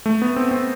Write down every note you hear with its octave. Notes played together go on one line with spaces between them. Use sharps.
A3
B3
C4
C4